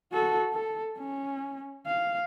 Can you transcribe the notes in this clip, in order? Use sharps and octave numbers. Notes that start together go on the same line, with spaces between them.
F#4 A4
A4
C#4
F5